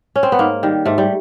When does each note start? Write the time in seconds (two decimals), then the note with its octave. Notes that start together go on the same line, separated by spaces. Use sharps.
0.16 C#4
0.23 C4
0.32 B3
0.39 G#2 A#3
0.63 D#3 G3
0.85 G#2 A3
0.98 G3